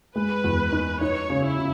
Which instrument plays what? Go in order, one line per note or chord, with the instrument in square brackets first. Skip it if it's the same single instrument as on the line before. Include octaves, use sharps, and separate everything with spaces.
[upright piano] G#3 [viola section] B4
[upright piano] E2
D#4
[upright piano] D#4 [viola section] C#5
[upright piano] C#3
[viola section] E4
[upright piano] C#3